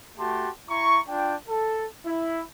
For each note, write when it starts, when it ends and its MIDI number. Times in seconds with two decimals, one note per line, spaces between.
0.18 0.49 57
0.18 0.49 66
0.18 0.49 67
0.18 0.49 81
0.18 0.49 84
0.69 1.00 64
0.69 1.00 82
0.69 1.00 85
1.09 1.36 62
1.09 1.36 65
1.09 1.36 79
1.48 1.85 69
2.05 2.41 64